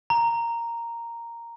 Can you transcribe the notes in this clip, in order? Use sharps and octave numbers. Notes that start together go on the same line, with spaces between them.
A#5